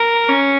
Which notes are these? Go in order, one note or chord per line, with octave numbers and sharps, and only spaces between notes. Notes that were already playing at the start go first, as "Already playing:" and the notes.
Already playing: A#4
C#4